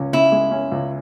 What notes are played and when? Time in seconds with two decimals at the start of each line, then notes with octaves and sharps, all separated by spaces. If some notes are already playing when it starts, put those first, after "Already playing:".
Already playing: C#2 C#4
0.13 C#3 E4
0.32 G#3
0.51 C#4
0.72 C#2